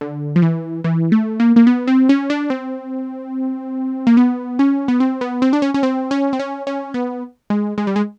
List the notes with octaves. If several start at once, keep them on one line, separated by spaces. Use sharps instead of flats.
D3
F3
E3
E3
A3
A#3
A#3
B3
C4
C#4
D4
C4
A#3
B3
C#4
B3
C4
B3
C4
D4
C#4
C#4
C4
C#4
C4
C#4
C#4
B3
G#3
G#3
G3
G#3